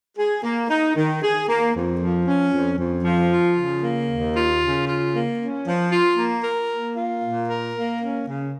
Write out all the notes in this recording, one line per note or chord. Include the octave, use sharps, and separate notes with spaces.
G#4
A#3
D#4
D#3
G#4
A#3
F2
F3
C#4
F2
F2
F3
F4
C#3
A#3
D#2
F4
C#3
F4
A#3
C#4
F3
F4
A#3
A#4
A#3
F4
A#2
A#4
A#3
C#4
C#3